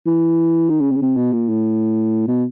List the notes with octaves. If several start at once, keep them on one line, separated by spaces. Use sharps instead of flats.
E3
D#3
C#3
C3
C#3
C3
B2
A#2
A2
B2